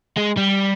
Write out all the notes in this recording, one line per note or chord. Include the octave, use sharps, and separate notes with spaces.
G#3
G3